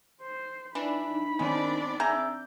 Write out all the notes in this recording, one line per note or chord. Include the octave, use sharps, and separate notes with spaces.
C5
E3 D4 D#4 B5
D#3 G#3 B3 C4 D4 D5
G#4 E5 A#5 G6